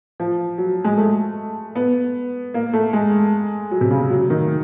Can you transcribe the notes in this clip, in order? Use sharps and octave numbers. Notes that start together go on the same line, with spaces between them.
F3
F#3
G#3
A3
B3
A#3
A3
G#3
F#3
C3
C#3
C#3
F#3
D#3